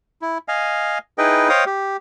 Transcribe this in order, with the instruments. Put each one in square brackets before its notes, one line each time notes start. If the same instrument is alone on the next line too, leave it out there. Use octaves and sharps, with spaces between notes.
[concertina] E4
D#5 F5 G#5
D#4 E4 G#4 B4 D#5 G5
C5 C#5 D#5 F5 G5 D#6
G4